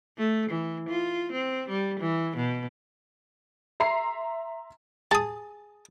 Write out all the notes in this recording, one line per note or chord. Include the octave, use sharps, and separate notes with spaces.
A3
E3
F4
C4
G3
E3
B2
E5 A#5 C6 C7
G#4 A5 D#6